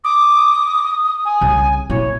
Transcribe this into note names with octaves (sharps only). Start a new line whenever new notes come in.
D6 D#6
G#5
C2 C#3
A#2 E4 C#5